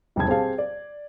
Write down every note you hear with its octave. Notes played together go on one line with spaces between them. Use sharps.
D#1 C2 G2 B2 A5 G#6
C4 G4 G#4 F5 A5
D5